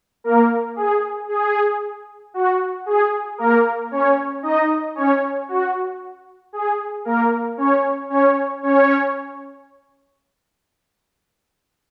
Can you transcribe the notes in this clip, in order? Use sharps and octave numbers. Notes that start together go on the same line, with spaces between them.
A#3 A#4
G#4
G#4
F#4
G#4
A#3 A#4
C#4 C#5
D#4 D#5
C#4 C#5
F#4
G#4
A#3 A#4
C#4 C#5
C#4 C#5
C#4 C#5